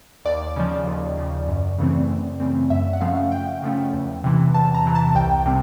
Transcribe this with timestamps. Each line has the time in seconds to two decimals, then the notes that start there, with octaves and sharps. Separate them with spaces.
0.25 D#2 D5
0.56 C#3 F3
0.87 D#2
1.17 C#3 F3
1.48 F#2
1.79 C#3 E3 A3 C4
2.09 F#2
2.40 C#3 E3 A3 C4
2.70 F#2 E5
2.93 F#5
3.01 C#3 F3 A3 C#4 F5
3.32 F#2 G5
3.62 C#3 F3 A3 C#4
3.93 E2
4.24 C3 E3
4.54 E2 A5
4.75 A#5
4.85 C3 E3
4.95 A5
5.15 C2 G5
5.45 C3 G3 C4